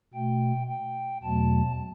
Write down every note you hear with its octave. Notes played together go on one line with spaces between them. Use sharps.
B2 A3 G5
G5
E2 B2 F#3 A3 A5